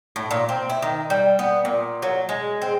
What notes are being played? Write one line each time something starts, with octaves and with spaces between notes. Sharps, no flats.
A2
A#2
C4
E4
D#3
G3
B3
A#2
F#3
G#3
C4